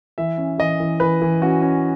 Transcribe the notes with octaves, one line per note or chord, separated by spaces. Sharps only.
E3 E5
C#4
E3 D#5
E3
E3 B4
E3
C#4 F#4
C#4